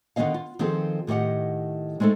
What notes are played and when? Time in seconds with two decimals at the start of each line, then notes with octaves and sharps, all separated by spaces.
0.16 D3 D#3 B3 C#4 D#5 F5
0.34 F4
0.59 D#3 F3 C4 F4 G#4 A4
1.07 A2 D#3 G4 D#5 F#5
2.00 G#3 A3 C4 D#4 A4